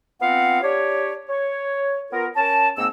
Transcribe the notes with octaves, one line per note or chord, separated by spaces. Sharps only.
B3 C4 F4 F5 F#5
D4 G4 C#5
C#5
B3 F4 A#4
C#4 A#4 A5
G#2 A#3 C4 E6